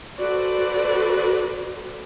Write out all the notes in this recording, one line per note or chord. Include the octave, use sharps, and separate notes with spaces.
F#4 A4 B4 C5 D5